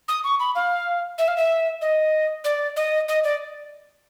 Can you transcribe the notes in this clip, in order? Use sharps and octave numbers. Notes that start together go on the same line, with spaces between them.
D#6
C#6
B5
F5
E5
F5
E5
D#5
D5
D#5
D#5
D5